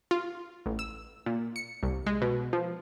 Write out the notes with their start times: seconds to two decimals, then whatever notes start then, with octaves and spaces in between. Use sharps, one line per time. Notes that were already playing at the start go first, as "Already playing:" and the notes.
0.11 F4
0.66 A1
0.79 E6
1.26 A#2
1.56 C#7
1.83 C2
2.07 G#3
2.22 B2
2.53 F3